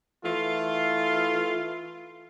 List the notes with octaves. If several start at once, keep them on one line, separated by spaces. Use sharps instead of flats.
E3 A3 F4